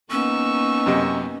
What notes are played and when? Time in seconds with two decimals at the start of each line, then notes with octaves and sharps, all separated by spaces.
0.11 A#3 B3 C#4 D#4 C#6 E6
0.86 F#2 C3 D#5